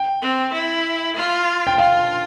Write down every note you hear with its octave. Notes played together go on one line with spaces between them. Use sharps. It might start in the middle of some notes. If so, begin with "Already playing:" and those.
Already playing: G5
C4
E4
F4
G5
F4 F5